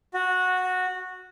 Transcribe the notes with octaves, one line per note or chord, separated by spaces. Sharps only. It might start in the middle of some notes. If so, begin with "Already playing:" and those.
F#4